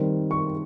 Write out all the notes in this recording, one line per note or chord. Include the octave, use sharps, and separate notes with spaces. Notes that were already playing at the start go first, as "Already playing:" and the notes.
Already playing: D#3 G3 C4
C#6